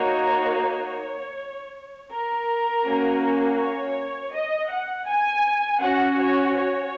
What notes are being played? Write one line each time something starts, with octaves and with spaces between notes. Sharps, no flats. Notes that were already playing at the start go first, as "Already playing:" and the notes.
Already playing: A#3 D#4 F#4 C#5
C#5
A#4
A#3 C#4 F#4
C#5
D#5
F#5
G#5
C#4 F#4 F#5
C#5
C#5